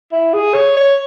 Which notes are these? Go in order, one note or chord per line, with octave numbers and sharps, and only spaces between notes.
E4
G#4
C#5
C#5